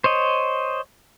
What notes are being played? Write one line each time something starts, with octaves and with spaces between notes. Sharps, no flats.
C5 C#5 D#5